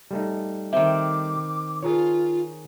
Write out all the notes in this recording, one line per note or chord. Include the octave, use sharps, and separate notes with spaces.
G3 A3 D#4
D#3 C4 E5 D6
F4 G#4 A#4 C#5